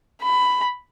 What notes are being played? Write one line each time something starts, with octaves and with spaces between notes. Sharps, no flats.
B5